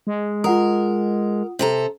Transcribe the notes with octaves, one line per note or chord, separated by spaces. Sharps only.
G#3
F4 A#4 F#5 D#6
C3 A4 A#5